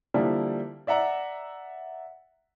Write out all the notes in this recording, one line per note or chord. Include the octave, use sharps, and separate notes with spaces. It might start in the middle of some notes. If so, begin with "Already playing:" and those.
D3 F3 G3 A#3 D4 E4
D5 E5 F#5 A#5